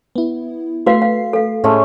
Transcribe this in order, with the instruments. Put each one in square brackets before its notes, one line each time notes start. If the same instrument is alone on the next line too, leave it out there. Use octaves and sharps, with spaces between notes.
[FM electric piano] B3 E4
[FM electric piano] A3 C7 [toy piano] F#4 B4 F5
[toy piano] F5
A4 F5
[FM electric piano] A2 [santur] G#3 A3 C#4